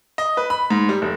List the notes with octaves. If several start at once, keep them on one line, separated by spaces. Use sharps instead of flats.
D#5
B4
B5
G#2
G3
F1